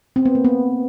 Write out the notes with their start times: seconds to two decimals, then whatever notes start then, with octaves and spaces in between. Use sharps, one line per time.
0.16 C4
0.25 B3
0.35 A#3
0.45 B3